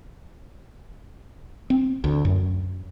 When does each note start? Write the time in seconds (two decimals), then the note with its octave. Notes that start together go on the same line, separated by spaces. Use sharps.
1.70 C4
2.04 D2
2.25 F#2